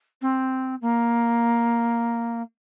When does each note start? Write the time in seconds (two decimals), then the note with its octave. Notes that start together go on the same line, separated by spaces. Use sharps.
0.22 C4
0.81 A#3